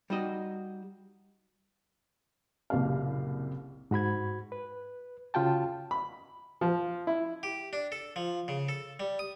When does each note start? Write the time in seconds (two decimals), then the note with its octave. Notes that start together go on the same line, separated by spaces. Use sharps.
0.10 G3 D#4 F#4 D#5
2.70 F#1 C2 A#2 A#3 G4 F5
3.91 G#2 F#4 B5 G#6
4.52 B4
5.34 C#3 F4 F#4 G5 A5
5.91 B5
6.61 F3
7.07 E4
7.43 G4
7.73 D4
7.92 A4
8.16 F3
8.48 C#3
8.69 A4
9.00 G3
9.19 D#6